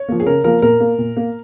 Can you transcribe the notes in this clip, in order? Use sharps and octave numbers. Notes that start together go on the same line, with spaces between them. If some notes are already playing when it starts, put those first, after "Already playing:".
Already playing: C#5
F3 A#3
G#4
C#3 A#4
F3 A#3 A#4
A#2 A#4
A#3
A#2
A#3